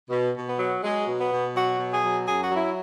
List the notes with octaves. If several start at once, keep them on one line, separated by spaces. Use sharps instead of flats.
B2
B2
B3
F#3
F#3 G#3
B2
B3
B2
F#3 F#4
B2
G#4
F#3
F#2 G#4
F#4
F#3 E4